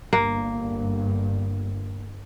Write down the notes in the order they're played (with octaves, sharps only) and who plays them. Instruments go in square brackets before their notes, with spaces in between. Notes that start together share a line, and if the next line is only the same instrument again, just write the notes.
[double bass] G1 G2 [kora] A#3